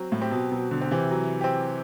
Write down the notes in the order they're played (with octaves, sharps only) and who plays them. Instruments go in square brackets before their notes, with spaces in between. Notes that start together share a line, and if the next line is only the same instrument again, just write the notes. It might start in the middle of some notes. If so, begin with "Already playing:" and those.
Already playing: [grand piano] F#3 C4
[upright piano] A2
[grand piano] C4 G4
[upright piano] B2
[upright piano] B2 [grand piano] F#3
[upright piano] B2 D3
[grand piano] C4 G4
[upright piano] C3 E3
[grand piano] F#3
C4 G4